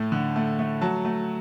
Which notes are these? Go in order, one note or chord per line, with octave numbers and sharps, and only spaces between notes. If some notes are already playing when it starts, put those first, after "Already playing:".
Already playing: A2 A3
D3
A3
A3
F#3 A5
A3